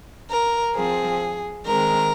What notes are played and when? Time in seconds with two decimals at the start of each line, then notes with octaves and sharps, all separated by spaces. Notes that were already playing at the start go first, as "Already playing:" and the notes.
0.30 A#4
0.75 F3 C4 G#4
1.66 D#3 G#3 C4 A#4